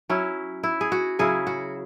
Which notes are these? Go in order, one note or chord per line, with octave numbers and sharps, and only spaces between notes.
F#3 C#4 E4
E4
G#4
F#4
C#3 F#3 C#4 E4 G#4
F#4